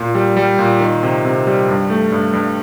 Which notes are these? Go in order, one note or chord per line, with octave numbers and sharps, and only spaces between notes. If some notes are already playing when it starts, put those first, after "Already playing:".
Already playing: A#2
G3
G3
A#2
D#3
C3
C3
G3
G2
A3
G2
G2